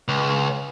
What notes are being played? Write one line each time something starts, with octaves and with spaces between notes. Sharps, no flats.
C#2